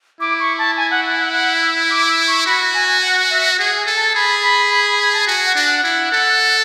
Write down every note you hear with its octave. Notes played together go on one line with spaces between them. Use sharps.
E4 D6
C#6
A5
G#5
F#5
F#5
F#5
F#5
E6
D6
E6
C#6
F#4 B5
G#5
G#5
F#5
E5
G#4 F#5
G#5
A4
A5
G#4 B5
B5
B5
B5
B5
A5
F#4 G#5
F#5
D4
F#5
E4
A4